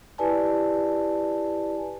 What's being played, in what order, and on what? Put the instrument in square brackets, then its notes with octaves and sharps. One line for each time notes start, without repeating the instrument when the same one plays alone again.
[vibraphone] E4 G4 B4 D5 G#5 A5